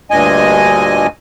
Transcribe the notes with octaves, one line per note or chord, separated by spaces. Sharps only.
D2 G2 A#2 D#5 G#5